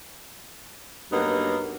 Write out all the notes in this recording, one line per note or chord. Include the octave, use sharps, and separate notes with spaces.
G2 F#3 A#3 B3 D#4